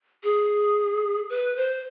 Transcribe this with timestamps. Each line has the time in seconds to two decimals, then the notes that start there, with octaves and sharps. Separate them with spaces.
0.23 G#4
1.30 B4
1.56 C5